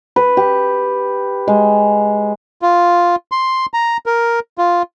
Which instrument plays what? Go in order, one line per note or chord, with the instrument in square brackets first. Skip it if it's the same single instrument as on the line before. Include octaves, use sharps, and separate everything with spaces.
[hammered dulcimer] B4
G4
G#3
[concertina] F4
C6
A#5
A#4
F4